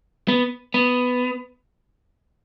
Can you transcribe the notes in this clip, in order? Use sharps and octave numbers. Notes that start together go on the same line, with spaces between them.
B3
B3